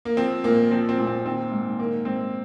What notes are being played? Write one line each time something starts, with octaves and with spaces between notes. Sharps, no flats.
A#3
F3 C4
A#2 A#3
F3 C4
C4
A#2
C4
D#3 C4
G#2
D#3 A#3
G#2 C4